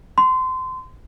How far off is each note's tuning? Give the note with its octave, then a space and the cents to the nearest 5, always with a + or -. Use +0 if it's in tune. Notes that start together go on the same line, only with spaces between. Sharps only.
C6 -25